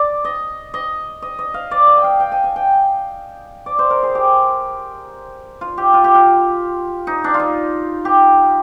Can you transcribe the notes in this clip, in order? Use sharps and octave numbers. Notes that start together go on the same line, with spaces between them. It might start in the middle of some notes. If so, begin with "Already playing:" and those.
Already playing: D5
D#5
D#5
D#5
D#5
F5
D5
D#5
G5
F5
G5
G#5
G#5
G5
D5
C5
A#4
G#4
G4
F4
G4
F4
G4
F4
D#4
D4
F4
D#4
G4